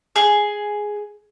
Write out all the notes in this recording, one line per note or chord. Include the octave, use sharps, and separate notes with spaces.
G#4